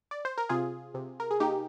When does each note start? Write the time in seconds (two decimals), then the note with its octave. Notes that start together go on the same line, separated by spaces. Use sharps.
0.11 D5
0.25 C5
0.38 A#4
0.49 C3 F4 G#4
0.94 C3
1.20 A#4
1.31 G#4
1.40 A#3 D#4 G4